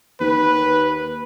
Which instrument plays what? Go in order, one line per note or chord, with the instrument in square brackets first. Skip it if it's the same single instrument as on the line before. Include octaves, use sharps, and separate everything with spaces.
[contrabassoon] D#2 [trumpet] B4